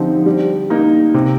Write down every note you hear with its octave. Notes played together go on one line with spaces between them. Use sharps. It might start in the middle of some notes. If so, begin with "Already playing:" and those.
Already playing: D3 F3 C4 D#4 G4
G3
A#3 D#4
C3